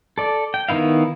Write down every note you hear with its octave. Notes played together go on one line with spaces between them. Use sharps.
A4 D5
G5
D#3 B3 E4 F5